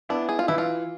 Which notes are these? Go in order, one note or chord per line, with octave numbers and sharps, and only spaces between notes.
B3 D4 E4
G#4
F4
E3 E4
F4